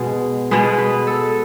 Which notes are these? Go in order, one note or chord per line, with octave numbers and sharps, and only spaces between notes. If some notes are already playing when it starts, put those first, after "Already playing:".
Already playing: B2 G#3
B2 G#3 B4
B4
A4